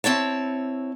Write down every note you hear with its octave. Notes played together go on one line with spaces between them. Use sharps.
C4 E4 C#5 A5